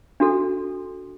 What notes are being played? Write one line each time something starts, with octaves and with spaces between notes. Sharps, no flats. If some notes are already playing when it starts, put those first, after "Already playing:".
D4 F#4 A4